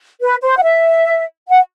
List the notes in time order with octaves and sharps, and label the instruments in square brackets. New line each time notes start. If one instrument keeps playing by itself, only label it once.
[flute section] B4
C5
F#5
E5
F#5